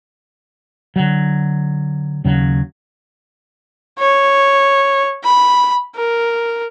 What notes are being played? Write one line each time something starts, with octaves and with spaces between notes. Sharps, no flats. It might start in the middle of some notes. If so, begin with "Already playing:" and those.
D3 F#3
D#2 C#3 F#3
C#5
B5
A#4